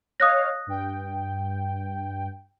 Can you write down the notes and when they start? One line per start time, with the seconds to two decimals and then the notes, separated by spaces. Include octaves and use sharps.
0.20 C#5 D#5 F5 D#6 F#6 A#6
0.67 G2 G5